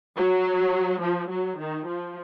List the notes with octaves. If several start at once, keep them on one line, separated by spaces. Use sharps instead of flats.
F#3
F3
F#3
D#3
F3